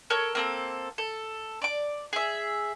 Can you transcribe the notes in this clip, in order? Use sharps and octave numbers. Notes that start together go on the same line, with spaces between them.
A4 A#4 C#5
A#3 C4 A4
A4
D5 D6
G#4 E5